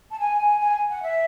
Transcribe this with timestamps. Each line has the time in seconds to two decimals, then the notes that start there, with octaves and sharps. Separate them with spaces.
0.11 A5
0.19 G#5
0.60 G#5
0.88 F#5
1.02 E5